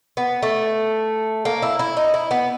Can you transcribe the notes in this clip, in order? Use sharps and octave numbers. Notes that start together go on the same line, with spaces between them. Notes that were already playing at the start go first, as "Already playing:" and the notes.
B3
A3
A#3
E4
E4
D#4
E4
B3